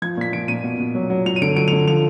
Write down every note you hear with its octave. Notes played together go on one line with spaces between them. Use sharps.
F3 G#6
A#2 B6
F3 D7
A#2 D#7
B2
B2
F#3
F#3
F#3 F7
D#7
D3 D7
F#3 D7
F7
D3
F3 F7